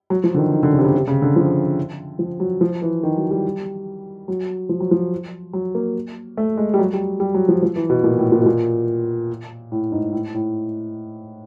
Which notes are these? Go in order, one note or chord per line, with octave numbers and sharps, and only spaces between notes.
F#3
F3
D3
D#3
D#3
D3
C#3
C3
C#3
C3
C#3
D3
F3
F3
F#3
F3
E3
D#3
F#3
G3
F#3
F3
F#3
F3
F#3
A#3
A3
G#3
G3
F#3
G3
G3
F#3
F3
F3
E3
B2
A#2
A2
A#2
B2
A#2
A2
G#2
A2
A2